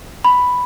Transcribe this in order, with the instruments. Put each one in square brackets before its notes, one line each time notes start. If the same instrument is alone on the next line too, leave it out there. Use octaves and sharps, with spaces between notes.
[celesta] B5